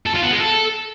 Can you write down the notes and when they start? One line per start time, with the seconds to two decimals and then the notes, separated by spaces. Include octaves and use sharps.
0.06 A4
0.14 F4
0.23 B3
0.31 G#3
0.40 A4